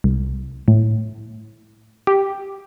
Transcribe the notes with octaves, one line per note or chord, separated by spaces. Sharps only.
C2
A2
G4